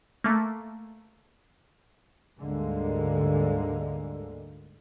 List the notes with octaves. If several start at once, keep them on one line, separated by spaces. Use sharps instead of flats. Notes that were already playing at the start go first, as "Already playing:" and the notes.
A3 A#3
D2 G#2 D3 G3 G#3 A#3